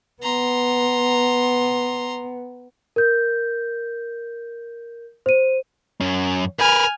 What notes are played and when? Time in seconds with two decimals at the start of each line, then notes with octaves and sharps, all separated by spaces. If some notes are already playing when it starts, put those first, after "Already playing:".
0.23 B3 A#5 C6
2.96 A#4 G6
5.26 C5 D#7
6.01 F#2 C#4
6.59 A#4 B4 G#5 F6